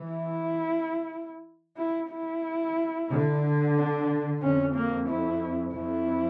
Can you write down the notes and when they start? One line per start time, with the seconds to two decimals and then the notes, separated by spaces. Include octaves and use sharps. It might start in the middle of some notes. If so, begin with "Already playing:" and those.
Already playing: E3
0.10 E4
1.76 E4
2.10 E4
3.09 D3
3.75 D4
4.42 F2 C#4
4.75 A#3
5.09 E4
5.74 F2 E4